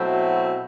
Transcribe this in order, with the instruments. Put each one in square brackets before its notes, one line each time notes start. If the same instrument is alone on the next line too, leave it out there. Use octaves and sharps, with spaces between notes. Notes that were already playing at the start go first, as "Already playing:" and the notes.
Already playing: [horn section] B2 F#3 A3 C4 E4